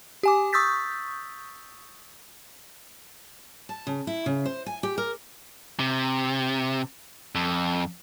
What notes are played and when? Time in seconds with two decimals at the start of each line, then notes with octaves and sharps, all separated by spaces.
0.23 G4 G#5 D6
0.53 C#6 D#6 E6 G6 A6 B6
3.69 A5
3.87 C#3
4.07 E4
4.26 C#3
4.45 C5
4.66 G#5
4.83 G4
4.98 A#4
5.79 C3
7.35 F2